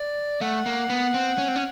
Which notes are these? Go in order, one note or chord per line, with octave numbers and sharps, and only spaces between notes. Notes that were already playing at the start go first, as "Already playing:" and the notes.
Already playing: D5
A3 F#5
A#3
B3
C4
C#4
C4
C#4